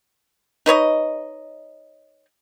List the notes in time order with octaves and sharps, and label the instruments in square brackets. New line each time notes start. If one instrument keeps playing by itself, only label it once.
[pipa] D#4 B4 C#5 D#5